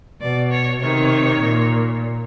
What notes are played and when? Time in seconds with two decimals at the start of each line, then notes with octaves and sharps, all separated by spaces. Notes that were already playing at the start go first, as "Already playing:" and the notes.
0.21 B2 D5
0.51 C#5
0.80 C3 D#3 C#5
1.40 A#2